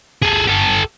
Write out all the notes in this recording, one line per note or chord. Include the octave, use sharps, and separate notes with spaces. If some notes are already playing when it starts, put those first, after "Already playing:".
G#4 A4
G4 A4